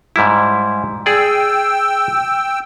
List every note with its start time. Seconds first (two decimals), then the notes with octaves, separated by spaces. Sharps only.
0.16 G#2 G3 E4
1.06 G#4 D5 G5 E6